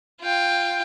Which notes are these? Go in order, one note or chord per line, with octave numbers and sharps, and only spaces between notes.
F4 G5